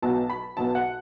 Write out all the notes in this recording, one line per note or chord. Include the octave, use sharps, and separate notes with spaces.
B1 B2 F#3 A5
B5
B1 B2 F#3 A5
F#5